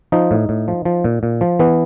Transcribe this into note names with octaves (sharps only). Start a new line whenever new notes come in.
F3 D#4
A2
A2
F3
F3
A#2
A#2
F3
E3 B3